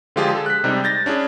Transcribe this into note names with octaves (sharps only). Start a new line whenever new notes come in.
D3 F3 G#3 F4 G4 G#4
G#4 A4
F#6 B6
C3 G3 G#3 D#4 G4
G6 A6 A#6
C#4 D4 E4 G#4